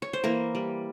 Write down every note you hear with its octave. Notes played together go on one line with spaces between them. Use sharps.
C#5
C5
E3 A#3 A#4
G3